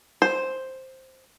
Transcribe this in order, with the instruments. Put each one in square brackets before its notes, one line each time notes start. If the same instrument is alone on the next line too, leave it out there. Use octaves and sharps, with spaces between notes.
[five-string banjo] C5